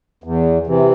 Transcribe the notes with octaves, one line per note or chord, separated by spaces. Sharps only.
E2
C3 E3